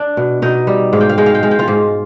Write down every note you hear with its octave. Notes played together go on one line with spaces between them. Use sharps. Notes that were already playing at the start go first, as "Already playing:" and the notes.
Already playing: D4 D5
B2
B2 D#4 D#5
G3
G#2 F5
G5
F5
G#3 G5
F5
G5
G#3 F5
G5
F4 F5
G#2